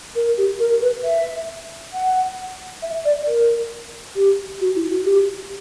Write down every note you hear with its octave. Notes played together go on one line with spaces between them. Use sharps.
A#4
G4
A#4
B4
E5
F#5
E5
D5
A#4
G4
F#4
E4
F#4
G4